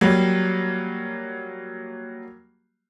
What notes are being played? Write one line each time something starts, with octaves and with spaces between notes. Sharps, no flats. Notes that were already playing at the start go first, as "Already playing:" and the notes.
F#3 G3 A#3